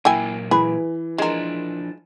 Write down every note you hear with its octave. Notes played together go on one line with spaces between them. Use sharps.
A#2 F#3 A#3 E4 G5 G#5
E3 G#4 B4
F3 G#3 D4 A#4